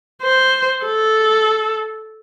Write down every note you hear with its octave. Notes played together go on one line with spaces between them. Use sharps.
C5
A4